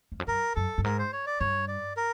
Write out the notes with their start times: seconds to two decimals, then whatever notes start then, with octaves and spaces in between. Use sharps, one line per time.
0.12 E2
0.20 F2
0.27 F#2 A#4
0.56 F#2 A4
0.78 G2
0.84 G#2 A#4
0.99 C5
1.13 C#5
1.26 D5
1.40 G2 C#5
1.68 D5
1.97 A#4